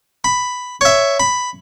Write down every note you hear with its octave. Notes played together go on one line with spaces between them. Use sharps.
B5
C#5 E5
B5